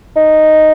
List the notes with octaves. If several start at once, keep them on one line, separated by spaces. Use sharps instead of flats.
D#4